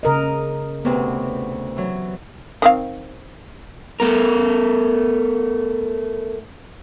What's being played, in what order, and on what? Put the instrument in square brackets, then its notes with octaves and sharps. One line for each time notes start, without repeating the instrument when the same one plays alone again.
[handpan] C#3 A#4 D#5
[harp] D2 C3 C#4 [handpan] B3
[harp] E3 F#3
[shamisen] D#3 C4 F5
[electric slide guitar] A3 B3 A#4